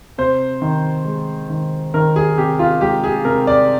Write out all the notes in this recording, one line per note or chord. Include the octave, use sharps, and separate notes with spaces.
C3 C5
D#3
G#3
D#3
D#3 A#4
G#4
C3 G4
F4
G#3 G4
G#4
C3 A#4
D5